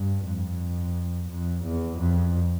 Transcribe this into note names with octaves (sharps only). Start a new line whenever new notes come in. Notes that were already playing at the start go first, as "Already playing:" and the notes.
Already playing: G2
F2
F2
E2
F2